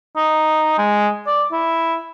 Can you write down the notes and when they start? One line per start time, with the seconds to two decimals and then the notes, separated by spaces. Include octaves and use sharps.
0.16 D#4
0.78 G#3
1.27 D5
1.52 E4